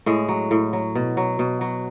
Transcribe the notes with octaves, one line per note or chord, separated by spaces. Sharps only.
A2 G#3
F#3
A2
F#3
B2
F#3
B2
F#3